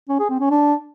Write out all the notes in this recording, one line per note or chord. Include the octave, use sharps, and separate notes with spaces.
C#4
G#4
C4
C#4
D4